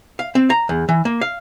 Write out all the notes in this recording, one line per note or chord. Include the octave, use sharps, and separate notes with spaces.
F5
C4
A#5
E2
E3
A#3
F5